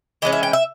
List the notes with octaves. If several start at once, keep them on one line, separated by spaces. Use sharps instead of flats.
E3 G#3 C#4 D#5
E5
G5
E5